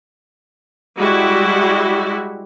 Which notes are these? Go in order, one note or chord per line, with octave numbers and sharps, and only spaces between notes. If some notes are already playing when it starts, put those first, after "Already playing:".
G3 G#3 E4 F#4